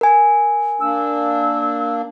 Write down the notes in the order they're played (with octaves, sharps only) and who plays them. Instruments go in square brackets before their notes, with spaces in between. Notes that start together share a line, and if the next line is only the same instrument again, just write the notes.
[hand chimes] A#4 G#5
[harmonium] A#3 D4 [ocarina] E6